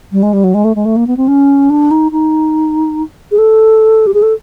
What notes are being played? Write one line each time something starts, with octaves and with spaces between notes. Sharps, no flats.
G3
G#3
G3
F#3
G#3
A3
G#3
A3
A#3
B3
C4
C#4
D4
D#4
D#4
G#4
A4
G4
G#4
A4